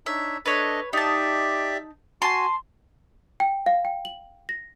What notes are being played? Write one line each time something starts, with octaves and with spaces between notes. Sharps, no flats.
D4 D#4 C#5 E5
D4 A4 B4 C#5 D#5
D#4 G4 D5 E5 A5
F#4 G#5 A5 C6
G5
F5
G5
F#7
A#6